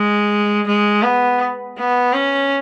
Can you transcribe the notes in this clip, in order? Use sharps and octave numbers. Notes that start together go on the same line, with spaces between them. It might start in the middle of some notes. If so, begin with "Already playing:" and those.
Already playing: G#3
G#3
B3
B3
C#4